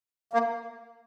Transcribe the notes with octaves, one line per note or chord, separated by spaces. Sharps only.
A#3